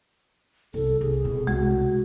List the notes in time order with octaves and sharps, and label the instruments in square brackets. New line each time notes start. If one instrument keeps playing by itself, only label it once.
[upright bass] C2 [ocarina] A4
[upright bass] C2 [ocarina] G#4
[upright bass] B2
[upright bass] C2 [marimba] G#3 [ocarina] F#4